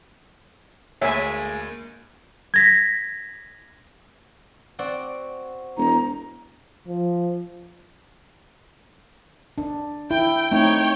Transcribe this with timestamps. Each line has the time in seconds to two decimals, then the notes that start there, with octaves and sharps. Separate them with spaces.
1.02 D2 G#3 A#3 C#5 E5 G#5
2.54 G#6 A#6 B6
4.79 C4 F#4 D5
5.78 E1 A#5
6.88 F3
9.58 D4
10.11 E4 G5
10.51 A3 C4 D#4 C#5 G5